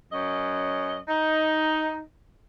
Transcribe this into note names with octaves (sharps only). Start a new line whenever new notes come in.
F#2 C#4 D#5
D#4